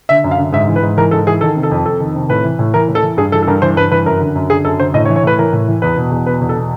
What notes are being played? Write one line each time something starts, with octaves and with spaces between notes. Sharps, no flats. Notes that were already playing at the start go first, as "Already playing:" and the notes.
D3 E5
F#2
F5
D3
G#2 E5
E3
B4
G#2
E3 A#4
G#2 A4
E3 G#4
D#3 A4
C3
A4
F2
F2 A4
D#3
C3
A2 B4
E3
A2
E3 A#4
A2
A4
E3
G2 G#4
E3 A4
A4
G2 A#4
E3 C5
G2 B4
E3 B4
F#2 A#4
D3
F#2
D3 G#4
F#2 A4
D3 C5
A2 D#5
C#5
E3
C#5
A2 B4
E3 A#4
A2
E3
E2 B4
B2
E2
B2 B4
E2
A4
B2